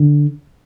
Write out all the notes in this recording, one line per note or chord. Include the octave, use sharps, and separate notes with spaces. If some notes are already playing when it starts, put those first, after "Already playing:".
Already playing: D3